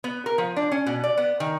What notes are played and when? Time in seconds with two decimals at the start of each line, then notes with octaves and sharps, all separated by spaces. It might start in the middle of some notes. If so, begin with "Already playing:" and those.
0.04 B3
0.26 A#4
0.38 F3
0.56 D4
0.72 C#4
0.86 B2
1.04 D5
1.17 B3
1.40 D#3